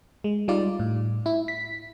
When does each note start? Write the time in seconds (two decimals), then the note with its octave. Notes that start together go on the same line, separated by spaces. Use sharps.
0.24 G#3
0.48 G3 D#4 F4 D5
0.79 A2
1.26 E4
1.48 B6